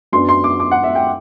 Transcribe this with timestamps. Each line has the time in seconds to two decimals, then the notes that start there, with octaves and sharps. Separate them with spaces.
0.12 F#2 F#3 B3 D4 C6
0.29 C6
0.44 D6
0.60 D6
0.71 F#5
0.84 E5
0.95 G5